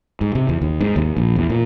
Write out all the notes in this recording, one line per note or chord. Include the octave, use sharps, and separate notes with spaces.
G#2
C3
E2
D#2
G#2
D#2
A#1
E2
A#2